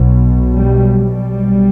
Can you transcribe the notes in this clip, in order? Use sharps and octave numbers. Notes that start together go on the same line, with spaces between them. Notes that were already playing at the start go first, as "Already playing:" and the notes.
Already playing: B1 B2
G3
G3